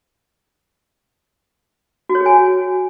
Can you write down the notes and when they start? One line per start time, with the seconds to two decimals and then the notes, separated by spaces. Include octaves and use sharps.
2.09 F#4
2.15 C#5
2.20 G#4
2.26 G#5